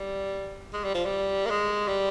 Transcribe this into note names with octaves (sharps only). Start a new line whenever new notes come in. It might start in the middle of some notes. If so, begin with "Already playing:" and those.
Already playing: G3
G#3
G3
F3
G3
A#3
G#3
G3